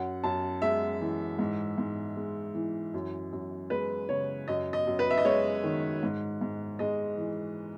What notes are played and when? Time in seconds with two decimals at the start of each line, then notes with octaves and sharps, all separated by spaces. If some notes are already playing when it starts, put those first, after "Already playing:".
Already playing: F#2 F#5
0.24 F#2 A5
0.62 G#3 E5
1.01 E3
1.39 G#2
1.78 G#2
2.17 G#3
2.54 E3
2.94 F#2
3.33 F#2
3.70 G#3 B4
4.09 C#3 C#5
4.48 F#2 D#5
4.73 D#5
4.87 F#2
4.99 B4
5.10 E5
5.18 D#5
5.25 G#3 C#5
5.64 D#3
6.03 G#2
6.41 G#2
6.79 G#3 D#5
7.18 E3